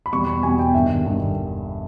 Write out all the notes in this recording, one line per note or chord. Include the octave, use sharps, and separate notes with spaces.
B5
E2 B2 G3 C#6
B5
E2 B2 G3 G#5
G5
G1 G2 D#3 E5
G1 G2 D#3